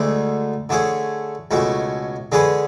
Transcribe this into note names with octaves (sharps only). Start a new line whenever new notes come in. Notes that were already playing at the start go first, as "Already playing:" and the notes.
Already playing: D2 D3 G#3
D3 A3 C#4 G#4
C#2 B2 A3 C#4
D3 G#3 C#4 G#4 B4